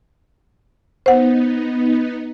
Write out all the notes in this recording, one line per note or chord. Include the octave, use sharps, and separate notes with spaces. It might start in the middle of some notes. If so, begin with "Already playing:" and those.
B3 D#4 C5 F#5